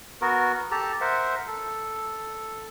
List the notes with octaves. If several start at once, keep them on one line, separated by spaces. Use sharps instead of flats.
B3 F#4 A#4
G4 A4 A5 A#5
A#4 C5 E5 F#5
A4